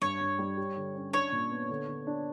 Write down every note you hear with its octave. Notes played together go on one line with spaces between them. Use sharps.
G2 C#5
G2
G3
G4
D3
C#4
D4 C#5
A#2
B3
D3
D3
D4